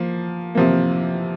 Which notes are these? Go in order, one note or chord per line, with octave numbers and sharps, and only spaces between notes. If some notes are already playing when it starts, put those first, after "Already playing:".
Already playing: F3 A#3
C3 F3 A#3